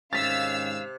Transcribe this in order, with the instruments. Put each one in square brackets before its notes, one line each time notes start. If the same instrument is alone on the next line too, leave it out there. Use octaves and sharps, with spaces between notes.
[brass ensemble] G#2 D#3 C#4 [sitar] C3 [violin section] F5 E6 [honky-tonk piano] A6 B6